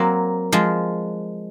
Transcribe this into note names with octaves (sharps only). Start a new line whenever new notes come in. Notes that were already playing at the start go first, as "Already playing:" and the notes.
Already playing: F#3 A#3 C4
F3 G#3